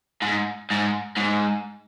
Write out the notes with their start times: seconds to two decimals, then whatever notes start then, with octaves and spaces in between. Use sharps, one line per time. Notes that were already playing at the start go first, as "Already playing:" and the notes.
0.22 G#2
0.70 G#2
1.17 G#2